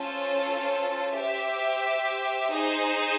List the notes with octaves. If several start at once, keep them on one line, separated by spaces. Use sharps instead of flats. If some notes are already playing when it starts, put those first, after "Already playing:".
Already playing: C#4 F4 A4 C5
G4 C5 E5
D#4 G#4 C5